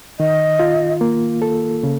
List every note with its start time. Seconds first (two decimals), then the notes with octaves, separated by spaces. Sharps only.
0.19 D#3 D#5
0.59 F4
1.01 A#3
1.42 A4
1.83 C#3